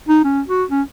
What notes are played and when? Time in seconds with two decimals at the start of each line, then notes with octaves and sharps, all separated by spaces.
0.09 D#4
0.24 C#4
0.48 F#4
0.71 C#4